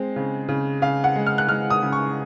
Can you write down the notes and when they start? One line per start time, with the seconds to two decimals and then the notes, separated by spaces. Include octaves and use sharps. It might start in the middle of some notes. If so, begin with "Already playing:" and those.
Already playing: G#3 C4
0.16 C#3
0.49 C#3
0.82 C#3 F5
1.04 F#5
1.16 G#3
1.27 F6
1.38 F#6
1.48 G#3 F6
1.70 D#6
1.82 C#3
1.93 C#6